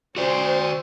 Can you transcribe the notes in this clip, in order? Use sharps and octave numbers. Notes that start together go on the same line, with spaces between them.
C#4 F#4 C5 D5